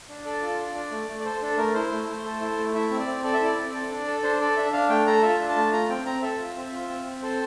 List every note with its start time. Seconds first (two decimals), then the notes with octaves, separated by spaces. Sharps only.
0.09 D4
0.25 A4 D5
0.41 F4
0.59 D4
0.75 D4
0.91 A3
1.08 A3
1.19 D5
1.25 A4 C5
1.41 D4 A4
1.57 A3 A#4
1.74 E4 C5
1.91 A3
2.08 A3
2.25 A4
2.41 E4
2.58 A3
2.74 E4 E5
2.91 C4
2.99 D5
3.07 C4
3.24 A4 D5
3.34 E5
3.41 E4 D5
3.56 C4
3.74 A4
3.90 D4
4.07 A4
4.23 D4 C5
4.40 A4 D5
4.57 D4 E5
4.73 D4 F5
4.90 A3 G5
5.06 A4 A#5
5.23 F4 E5
5.39 D4
5.49 A5
5.56 A3
5.73 F4 A#5
5.89 C4 G5
6.06 C4 A#5
6.22 A4 E5
6.39 F4
6.56 C4
6.72 F4
6.89 C4
7.06 C4
7.22 A4 C5